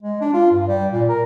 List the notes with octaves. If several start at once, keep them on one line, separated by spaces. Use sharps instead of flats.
G#3
D4
F4
G2
G3
A#2
A#4